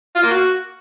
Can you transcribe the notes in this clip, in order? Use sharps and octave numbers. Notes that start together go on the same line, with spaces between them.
F4
A#3
F#4